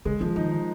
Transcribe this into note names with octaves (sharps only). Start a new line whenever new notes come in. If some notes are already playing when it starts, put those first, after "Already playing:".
C#3 G#3
D#3 F3
D#3 D#4
D#4